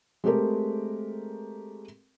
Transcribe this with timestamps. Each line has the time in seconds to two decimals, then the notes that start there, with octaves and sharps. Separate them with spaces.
0.24 G#3 A3 C4 G4 A4 A#4